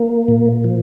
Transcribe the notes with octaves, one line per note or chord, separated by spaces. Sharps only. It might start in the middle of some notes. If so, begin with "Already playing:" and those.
Already playing: A#3
A#2
F3